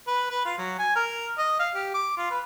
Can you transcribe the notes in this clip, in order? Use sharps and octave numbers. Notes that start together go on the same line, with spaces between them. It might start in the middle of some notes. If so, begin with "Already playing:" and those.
B4
B4
F4
F#3
G#5
A#4
D#5
F5
G4
D6
F4
B4